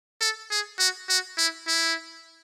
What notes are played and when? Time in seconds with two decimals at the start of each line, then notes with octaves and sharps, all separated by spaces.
0.21 A4
0.51 G#4
0.79 F#4
1.09 F#4
1.38 E4
1.67 E4